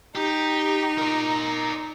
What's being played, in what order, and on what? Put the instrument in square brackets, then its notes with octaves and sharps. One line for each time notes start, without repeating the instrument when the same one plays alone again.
[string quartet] D#4 [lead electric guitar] G4
[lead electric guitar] A#4 D5